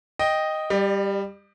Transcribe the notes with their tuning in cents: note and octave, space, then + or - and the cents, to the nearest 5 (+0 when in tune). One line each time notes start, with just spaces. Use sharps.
D#5 +0 G5 +0
G3 +10 D5 +45